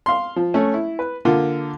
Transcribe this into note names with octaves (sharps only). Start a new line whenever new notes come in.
F5 C6
F3
A3 C#4
E4
B4
D3 A#3 F4